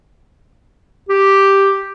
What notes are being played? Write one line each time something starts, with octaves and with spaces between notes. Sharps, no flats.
G4